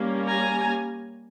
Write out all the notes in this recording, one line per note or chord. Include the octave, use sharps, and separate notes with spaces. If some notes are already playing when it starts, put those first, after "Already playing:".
Already playing: G3 A#3 C#4
G#5 A#5